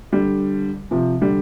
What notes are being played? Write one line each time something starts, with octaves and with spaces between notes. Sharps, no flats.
D3 G3
C3 F3
D3 G3